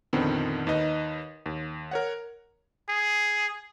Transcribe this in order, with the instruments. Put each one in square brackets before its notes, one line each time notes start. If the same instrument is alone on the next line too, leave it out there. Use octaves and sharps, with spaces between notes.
[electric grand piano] A#1 F2 D3 D#3 B3 C4
D#2 D#4 B4 D#5
D#2
A#4 C#5 F#5
[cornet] G#4